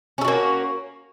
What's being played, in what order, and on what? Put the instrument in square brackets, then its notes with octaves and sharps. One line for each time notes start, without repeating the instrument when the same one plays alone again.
[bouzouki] C#4
A4
F#4
A#3